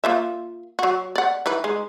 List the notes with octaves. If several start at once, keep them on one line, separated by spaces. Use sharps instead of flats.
A#3 F4 E5
F#3 F#4
D5 F#5
E3 D#4 B4
G#3 D#4